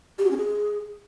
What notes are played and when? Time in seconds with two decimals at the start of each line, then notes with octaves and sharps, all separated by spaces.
0.18 G4
0.25 F#4
0.31 C#4
0.37 G#4